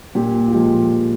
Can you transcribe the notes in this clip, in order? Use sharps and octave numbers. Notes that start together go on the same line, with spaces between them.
A#2 G4
F4
F3 G#3 G4